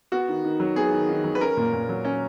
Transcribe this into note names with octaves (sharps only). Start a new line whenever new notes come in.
B3 F#4
D#3
D#3
F#3
B3 G#4
D#3
D#3
F#3
B4
C#4 A#4
A#2
A#2
F#3
C#4